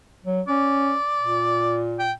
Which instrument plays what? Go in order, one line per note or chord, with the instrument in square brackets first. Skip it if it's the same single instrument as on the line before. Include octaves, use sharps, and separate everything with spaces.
[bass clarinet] F#3
[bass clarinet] C#4 [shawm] D5
[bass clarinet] A#2
[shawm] G5